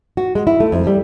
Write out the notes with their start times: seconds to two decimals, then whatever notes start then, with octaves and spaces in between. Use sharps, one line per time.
0.17 F#4
0.35 G#3
0.47 E4
0.60 A3
0.72 F2
0.87 G3